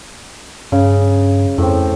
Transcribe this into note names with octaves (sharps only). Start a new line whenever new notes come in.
G2 C#3
F2 A2 C4